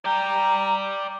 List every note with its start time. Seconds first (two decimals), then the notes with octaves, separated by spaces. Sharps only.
0.05 D5 G5 A#5